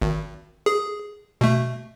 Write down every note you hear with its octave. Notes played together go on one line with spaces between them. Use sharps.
G#1
G#4
B2 A3